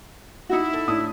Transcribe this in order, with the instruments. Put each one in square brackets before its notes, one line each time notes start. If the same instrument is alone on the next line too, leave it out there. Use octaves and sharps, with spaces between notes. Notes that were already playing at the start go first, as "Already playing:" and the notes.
[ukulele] D#4 F#4 [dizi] E4
[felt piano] A4
A2 D4 D#6